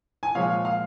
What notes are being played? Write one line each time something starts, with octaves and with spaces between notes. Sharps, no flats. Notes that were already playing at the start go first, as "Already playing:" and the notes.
G#5
A#2 F3 G#3 C#5 F5
F5